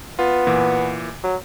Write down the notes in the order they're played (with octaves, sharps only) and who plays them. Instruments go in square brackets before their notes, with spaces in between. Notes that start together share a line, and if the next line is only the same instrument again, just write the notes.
[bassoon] B3 [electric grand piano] F4
[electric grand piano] A#2 E3
[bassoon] F#3